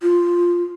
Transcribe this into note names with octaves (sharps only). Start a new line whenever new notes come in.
F4